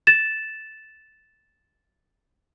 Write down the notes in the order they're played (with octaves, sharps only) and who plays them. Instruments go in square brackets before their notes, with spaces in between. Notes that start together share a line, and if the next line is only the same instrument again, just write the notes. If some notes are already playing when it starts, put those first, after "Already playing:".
[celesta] A6 E7